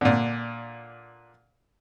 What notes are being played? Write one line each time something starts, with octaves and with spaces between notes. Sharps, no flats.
A#2 D3